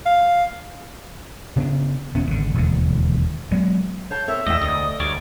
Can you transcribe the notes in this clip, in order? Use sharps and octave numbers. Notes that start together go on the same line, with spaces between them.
F5
C#3 B3 D4
E1 C#3 B3 C#4
G#1 D3
E1 D#2 D3
F#3 G#3 B3
C#5 F5 A5 G6
C4 A#4 C#5 E5
E2 A3 D5 D#5 G5
D2 D#6
D2 G3 C#5 D5 D7